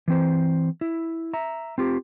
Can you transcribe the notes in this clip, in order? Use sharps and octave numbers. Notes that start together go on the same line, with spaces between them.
E3 C4 C5
E4
E5 A#5
C4 F4 G4